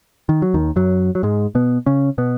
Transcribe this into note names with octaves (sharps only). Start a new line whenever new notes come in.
D#3
F#3
D#2 D#3
F#2 F#3
F#3
G#2 G#3
B2 B3
C#3 C#4
B2 B3